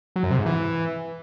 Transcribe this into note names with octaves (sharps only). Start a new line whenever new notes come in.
F#3
F#2
C3
G#2
E3